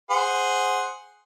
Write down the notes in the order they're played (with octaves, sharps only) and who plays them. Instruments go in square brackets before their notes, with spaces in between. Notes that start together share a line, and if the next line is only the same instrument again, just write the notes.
[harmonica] G#4 C5 F#5